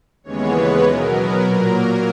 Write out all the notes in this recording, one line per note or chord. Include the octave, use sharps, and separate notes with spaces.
D#2 C#3 E3 G#3 B3 C#5
B4
B2 F#3 B3 A#4
B4
A#2 F#3 A#3 A#4